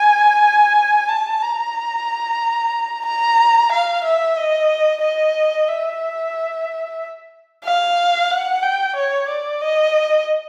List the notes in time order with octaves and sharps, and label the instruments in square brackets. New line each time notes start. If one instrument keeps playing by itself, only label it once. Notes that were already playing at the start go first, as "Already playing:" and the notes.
Already playing: [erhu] G#5
A5
A#5
A#5
F5
E5
D#5
D#5
E5
F5
F#5
G5
C#5
D5
D#5